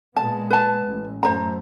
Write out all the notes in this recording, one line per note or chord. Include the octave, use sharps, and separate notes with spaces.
A#2 G#3 B3 A5
B4 A5
A1
F#2 A3 C5 A#5